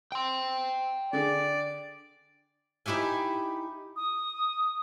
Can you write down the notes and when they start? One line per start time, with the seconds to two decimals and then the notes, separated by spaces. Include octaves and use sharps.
0.12 G5 C6
1.13 D3 G#4 D5
2.86 D#4 E4 G4 E5 G#5
3.96 D#6